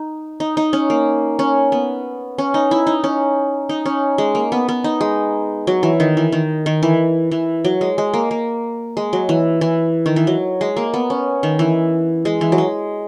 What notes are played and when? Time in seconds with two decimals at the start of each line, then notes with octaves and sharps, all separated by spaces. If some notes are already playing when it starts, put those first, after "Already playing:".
Already playing: D#4
0.40 D#4
0.57 D#4
0.73 C#4
0.90 A#3
1.39 C#4
1.72 B3
2.38 C#4
2.54 D#4
2.71 E4
2.87 D#4
3.04 C#4
3.69 D#4
3.86 C#4
4.18 G#3
4.35 A#3
4.52 B3
4.69 B3
4.84 D#4
5.01 G#3
5.67 F#3
5.83 E3
6.00 D#3
6.17 E3
6.32 D#3
6.66 D#3
6.83 E3
7.31 E3
7.65 F#3
7.81 G#3
7.98 G#3
8.14 A#3
8.31 A#3
8.97 G#3
9.13 F#3
9.29 E3
9.61 E3
10.06 D#3
10.16 E3
10.27 F#3
10.61 G#3
10.77 A#3
10.94 B3
11.10 C#4
11.43 D#3
11.59 E3
12.25 G#3
12.41 E3
12.52 F#3
12.58 G#3